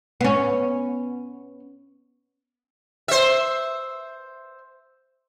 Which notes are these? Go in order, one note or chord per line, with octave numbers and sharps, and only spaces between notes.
B3 C#4
C5 E5